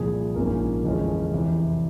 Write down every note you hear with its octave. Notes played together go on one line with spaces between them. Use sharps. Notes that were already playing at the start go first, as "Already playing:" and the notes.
Already playing: C2 A#2 F3 G#4
A#1 G#2 F3 A#3 C#4 A#4
G1 F2 E3 G#3 C#4
F1 E2 C3 E3